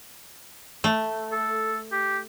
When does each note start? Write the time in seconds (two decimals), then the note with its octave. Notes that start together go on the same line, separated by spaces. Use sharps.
0.84 A3
1.32 A4
1.92 G4